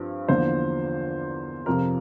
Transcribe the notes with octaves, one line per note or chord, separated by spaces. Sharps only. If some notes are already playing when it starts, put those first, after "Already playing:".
Already playing: G2 F3 C4
E2 D3 F3 A#3 C5
F2 C3 F3 A#4